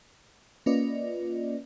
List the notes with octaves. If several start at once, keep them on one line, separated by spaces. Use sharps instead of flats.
A#3 C#4 F4 B4 D5 D#5